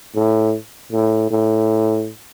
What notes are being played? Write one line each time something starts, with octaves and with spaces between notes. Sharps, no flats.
A2
A2
A2